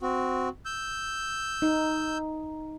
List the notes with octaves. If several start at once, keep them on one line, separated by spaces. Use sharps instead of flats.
C4 F#4
E6 G6
D#4